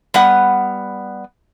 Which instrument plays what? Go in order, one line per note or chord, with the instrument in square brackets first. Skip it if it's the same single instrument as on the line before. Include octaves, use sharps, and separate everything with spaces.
[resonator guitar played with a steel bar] G3 B3 F#5